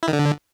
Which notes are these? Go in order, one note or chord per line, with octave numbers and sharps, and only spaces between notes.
E4
D#3
D3